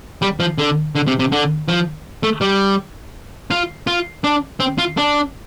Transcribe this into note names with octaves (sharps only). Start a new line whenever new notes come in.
G3
F3
D3
D3
C3
C3
D3
F3
A3
G3
F4
F4
D4
C4
F4
D4